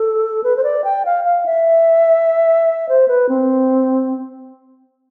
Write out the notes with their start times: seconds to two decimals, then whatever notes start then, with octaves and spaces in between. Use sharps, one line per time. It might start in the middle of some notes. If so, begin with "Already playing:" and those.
Already playing: A4
0.44 B4
0.56 C5
0.64 D5
0.84 G5
1.05 F5
1.25 F5
1.46 E5
2.89 C5
3.08 B4
3.29 C4